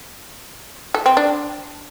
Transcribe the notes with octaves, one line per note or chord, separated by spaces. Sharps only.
A4
C4
D4